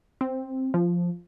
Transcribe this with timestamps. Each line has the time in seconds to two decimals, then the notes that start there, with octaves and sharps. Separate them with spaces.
0.21 C4
0.74 F3